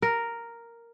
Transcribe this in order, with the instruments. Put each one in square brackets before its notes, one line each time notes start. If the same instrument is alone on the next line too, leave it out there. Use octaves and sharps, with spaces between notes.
[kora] A#4